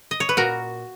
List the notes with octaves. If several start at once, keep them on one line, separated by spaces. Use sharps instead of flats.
D#5
C#5
B4
A#2 F#4 A#4